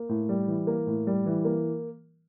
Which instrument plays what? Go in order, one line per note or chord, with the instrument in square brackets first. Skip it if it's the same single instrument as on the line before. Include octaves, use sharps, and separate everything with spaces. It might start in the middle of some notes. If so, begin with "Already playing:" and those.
Already playing: [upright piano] A#3
A2
G3
E3
A#3
A2
G3
E3
A#3